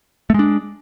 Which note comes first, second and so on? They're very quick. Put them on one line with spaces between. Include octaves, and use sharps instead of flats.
A3 G#3 D4